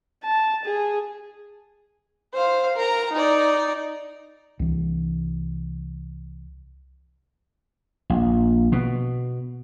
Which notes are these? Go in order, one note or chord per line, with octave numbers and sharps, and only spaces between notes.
A5
G#4
C5 F5
A#4 A#5
D#4 D5
C2 E3
A#1
B2